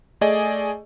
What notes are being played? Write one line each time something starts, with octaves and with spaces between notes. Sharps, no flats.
A3 G#4 D5 D#5 G#5